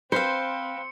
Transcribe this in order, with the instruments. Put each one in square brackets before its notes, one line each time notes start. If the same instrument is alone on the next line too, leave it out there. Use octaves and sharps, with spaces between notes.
[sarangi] C4 [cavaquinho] B4 F5 [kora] C5 [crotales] C#7